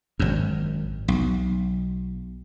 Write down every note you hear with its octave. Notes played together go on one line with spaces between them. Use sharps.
G#1 F#2
B1